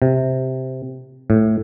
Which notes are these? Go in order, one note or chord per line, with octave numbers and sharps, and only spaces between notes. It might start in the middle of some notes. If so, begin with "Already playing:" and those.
C3
A2